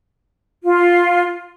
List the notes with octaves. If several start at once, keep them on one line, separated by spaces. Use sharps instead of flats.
F4